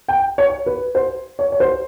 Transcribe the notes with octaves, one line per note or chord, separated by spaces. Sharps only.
G5
C#5
B4
C5
C#5
C#5
C5